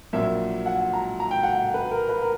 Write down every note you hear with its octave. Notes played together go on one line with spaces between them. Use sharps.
A#1 A#2 F#3 E5
F#5
A#5
A#5
G5
F#5
G5
B4
A#4
B4
A#4